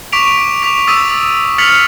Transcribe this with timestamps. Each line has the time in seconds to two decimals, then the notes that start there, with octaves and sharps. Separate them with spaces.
0.12 C#6 D6 B6 D7 F7
0.62 D6 B6 F7
0.87 D#6 E6 A6 B6 D#7
1.58 F6 A6 B6 C#7 F7 F#7